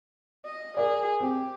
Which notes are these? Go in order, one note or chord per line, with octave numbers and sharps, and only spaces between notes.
D#5
G#4 A#4 D5
C4 G4